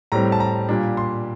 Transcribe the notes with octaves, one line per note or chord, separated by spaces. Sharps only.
A2 G3 C4 A#5
A5
A#5
A#2 G3 A#3 D4
C6